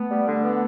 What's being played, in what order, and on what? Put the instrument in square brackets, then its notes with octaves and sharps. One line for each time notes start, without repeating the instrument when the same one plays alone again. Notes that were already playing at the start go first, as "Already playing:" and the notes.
Already playing: [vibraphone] A3 [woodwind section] B3
[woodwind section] G3
D3
B3